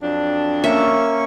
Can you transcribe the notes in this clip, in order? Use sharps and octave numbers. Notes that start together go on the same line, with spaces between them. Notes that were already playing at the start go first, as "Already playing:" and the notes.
F2 F#3 D4
A#3 C#4 E5 C#6